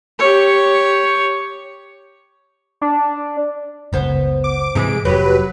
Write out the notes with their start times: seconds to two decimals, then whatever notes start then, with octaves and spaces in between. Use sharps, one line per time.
0.19 G4 C#5
2.81 D4
3.93 F#1 C#2 B3 C5
4.44 D6
4.75 G#2 C3 E3 G#3 G#4 D7
5.05 F1 F#3 G4 B4